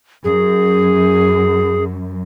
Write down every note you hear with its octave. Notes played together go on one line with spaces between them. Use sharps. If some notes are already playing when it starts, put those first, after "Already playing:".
F#2 G#4